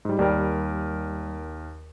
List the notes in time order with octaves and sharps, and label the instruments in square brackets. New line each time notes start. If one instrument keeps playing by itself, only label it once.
[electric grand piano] G#2 G3
[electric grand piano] D#2 A#4 [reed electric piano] G3